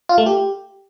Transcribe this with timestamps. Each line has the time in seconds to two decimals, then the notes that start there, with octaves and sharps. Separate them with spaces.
0.09 F4
0.18 A3
0.26 G4